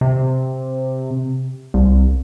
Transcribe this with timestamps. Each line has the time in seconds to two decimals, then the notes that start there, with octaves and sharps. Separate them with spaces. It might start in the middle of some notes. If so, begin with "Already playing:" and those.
0.01 C3
1.74 C2